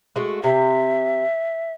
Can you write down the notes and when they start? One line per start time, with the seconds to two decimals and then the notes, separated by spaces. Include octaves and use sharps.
0.16 G#3 A3 F#4
0.44 C3 E5